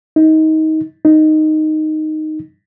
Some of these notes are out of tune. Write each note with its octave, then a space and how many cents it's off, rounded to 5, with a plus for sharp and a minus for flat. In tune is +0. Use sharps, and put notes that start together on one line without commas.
D#4 +20
D#4 -5